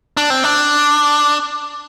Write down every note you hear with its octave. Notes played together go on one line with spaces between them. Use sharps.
D4
C4
D4